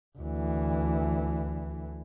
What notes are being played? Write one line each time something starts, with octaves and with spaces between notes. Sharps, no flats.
D2 E3